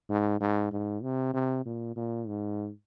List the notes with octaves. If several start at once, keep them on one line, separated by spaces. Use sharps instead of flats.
G#2
G#2
G#2
C3
C3
A#2
A#2
G#2